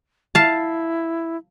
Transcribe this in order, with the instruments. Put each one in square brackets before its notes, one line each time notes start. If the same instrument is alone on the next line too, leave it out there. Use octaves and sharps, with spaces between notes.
[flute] E4 [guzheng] F5 A5